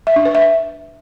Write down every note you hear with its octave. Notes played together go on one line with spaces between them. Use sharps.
E5
D4
B4
E5